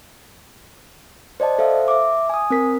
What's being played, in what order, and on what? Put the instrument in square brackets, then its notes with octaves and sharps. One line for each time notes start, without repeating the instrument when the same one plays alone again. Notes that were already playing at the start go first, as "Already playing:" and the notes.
[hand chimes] C5 D5 D#5 A5
A4 C5 E5 F5
E5 D6
G#5 D#6
C4 A#4 B6